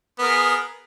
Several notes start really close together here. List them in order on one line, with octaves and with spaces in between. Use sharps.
B3 A#4 G#4